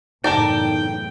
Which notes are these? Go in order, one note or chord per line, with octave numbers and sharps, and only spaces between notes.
F#1 E2 A2 D#4 A4 A#4 D5 G5